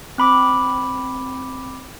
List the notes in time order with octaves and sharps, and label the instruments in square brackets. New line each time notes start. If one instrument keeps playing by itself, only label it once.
[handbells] C4 B5 D6